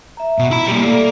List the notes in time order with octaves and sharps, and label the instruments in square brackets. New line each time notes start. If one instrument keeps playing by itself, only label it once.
[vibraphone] E5 A#5
[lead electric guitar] B2
[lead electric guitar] E4 B5 [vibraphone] E5
[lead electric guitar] G3 A#3
[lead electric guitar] A#3 [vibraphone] A4 D5